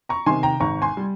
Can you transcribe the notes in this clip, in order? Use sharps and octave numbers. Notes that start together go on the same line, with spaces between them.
A#5 C#6
C3 D#3 G#5 C6
G5 A#5
G#1 A#5 C#6
G#5 C6
G3